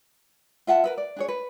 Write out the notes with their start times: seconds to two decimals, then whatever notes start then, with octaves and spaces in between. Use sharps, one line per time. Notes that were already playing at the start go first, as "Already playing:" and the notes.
0.67 F4 E5 F#5 A5
0.84 A#4 B4 E5
0.98 D5
1.16 D4 G#4 C#5
1.28 B4